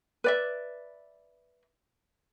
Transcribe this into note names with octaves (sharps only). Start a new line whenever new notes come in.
B4 D5 E5